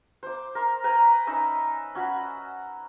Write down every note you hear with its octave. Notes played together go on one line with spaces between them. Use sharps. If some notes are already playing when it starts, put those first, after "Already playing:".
C5 D6
A#4 C6
B4 G5 G#5 A#5
C#4 D#4 E5
C#4 F#4 B5